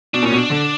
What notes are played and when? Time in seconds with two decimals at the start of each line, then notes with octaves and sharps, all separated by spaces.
0.14 B2 D4
0.23 A#2 C#4
0.32 B2
0.37 D4
0.50 D3